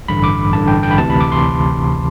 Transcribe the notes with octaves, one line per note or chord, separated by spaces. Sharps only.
A1 G2 D3 B5
D6
A1 G2 D3 A5
G5
G5
B5
D2 C3 E3 A5
B5
D6
C6